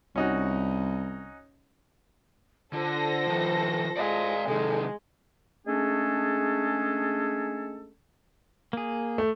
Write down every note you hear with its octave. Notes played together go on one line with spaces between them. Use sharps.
C2 C#4 D#4 F#4
D3 F4 A4 C5 A#6
D#3 F3
G#3 D5 F5
C3 D#3 G#3 A4
G#3 A3 C#4 D4 G#4 A4
A#3 G#4
A3